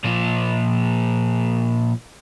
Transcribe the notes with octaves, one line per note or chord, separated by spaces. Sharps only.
A#2 F3